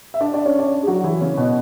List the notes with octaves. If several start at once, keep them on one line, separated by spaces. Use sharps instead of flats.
E5
D4 D5
D4 D5
C#4 C#5
D4 D5
G#4
F#3 F#4
E3 E4
C#3 C#4
B2 B3